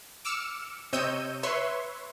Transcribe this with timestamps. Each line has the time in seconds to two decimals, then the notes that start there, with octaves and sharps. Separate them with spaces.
0.25 D6 E6 F6 C#7 E7
0.93 C3 C#5 D#5 E6 G6 D#7
1.43 B4 C#5 E5 C6 C#6